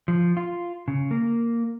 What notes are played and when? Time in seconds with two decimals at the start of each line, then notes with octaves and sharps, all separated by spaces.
0.08 F3
0.37 F4
0.88 C#3
1.11 A#3